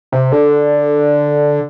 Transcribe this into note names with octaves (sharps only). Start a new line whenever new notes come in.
C3
D3